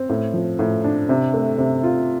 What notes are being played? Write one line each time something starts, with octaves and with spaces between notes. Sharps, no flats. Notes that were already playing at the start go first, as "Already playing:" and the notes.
Already playing: C4
A2
F3
A2
D4
C3
A3
C3
F4